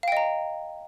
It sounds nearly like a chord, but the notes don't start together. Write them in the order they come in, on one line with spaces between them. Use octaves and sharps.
F5 G5 D#5 A#5